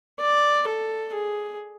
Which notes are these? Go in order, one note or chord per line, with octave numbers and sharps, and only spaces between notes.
D5
A4
G#4